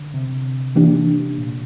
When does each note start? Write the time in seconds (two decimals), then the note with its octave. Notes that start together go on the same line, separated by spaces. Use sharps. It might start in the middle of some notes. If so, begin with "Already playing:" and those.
Already playing: D3
0.14 C3
0.76 E3 A#3 D4 G4
1.38 A#2